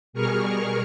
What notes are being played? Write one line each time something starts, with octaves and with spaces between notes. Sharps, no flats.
B2 G3 G#4 A#4 C#6 F6